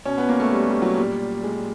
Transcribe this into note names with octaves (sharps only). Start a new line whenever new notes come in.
B2 C#4
B3
A#3
A3
G3
G3
F#3
A#2 G3
G#3